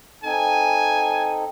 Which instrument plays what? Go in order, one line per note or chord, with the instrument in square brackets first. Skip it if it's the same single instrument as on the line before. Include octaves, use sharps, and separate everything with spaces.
[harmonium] C4 D#4 A4 [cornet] G#5